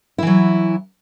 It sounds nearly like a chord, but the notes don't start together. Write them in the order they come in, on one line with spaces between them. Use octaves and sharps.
E4 E3 F#3